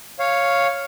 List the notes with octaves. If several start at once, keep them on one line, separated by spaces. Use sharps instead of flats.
C#5 F5